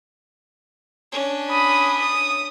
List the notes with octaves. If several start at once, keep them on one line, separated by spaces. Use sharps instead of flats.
C#4 D4
B5 D#6
D#6